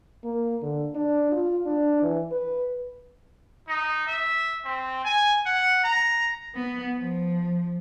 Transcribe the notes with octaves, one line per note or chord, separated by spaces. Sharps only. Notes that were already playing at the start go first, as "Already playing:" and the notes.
A#3
D3
D4
F4
D4
E3
B4
D#4
E5
C4
G#5
F#5
A#5
B3
F3